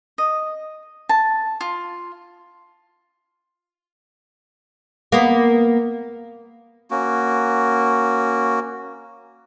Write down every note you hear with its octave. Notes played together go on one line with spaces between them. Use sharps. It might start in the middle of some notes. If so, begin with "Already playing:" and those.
D#5
A5
F4
A#3 B3
A#3 C#4 F#4